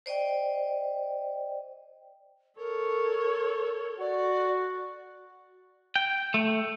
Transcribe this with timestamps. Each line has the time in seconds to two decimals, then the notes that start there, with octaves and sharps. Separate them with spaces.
0.06 C5 D5 D#5 G5
2.58 A4 A#4 C#5
4.00 F#4 D5
5.96 G5
6.34 A3